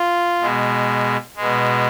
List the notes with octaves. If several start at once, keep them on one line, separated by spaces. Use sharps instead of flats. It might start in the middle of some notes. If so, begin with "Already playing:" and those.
Already playing: F4
B2 G#3
B2 G#3